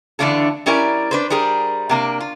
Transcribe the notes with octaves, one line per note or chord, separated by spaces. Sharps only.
D3 E3 A3 D4 F4 A4
G3 C#4 E4 A#4 D5 G#5
D4 B4 C5
G3 G#4 A#4 C5
C3 A#3 D4
F4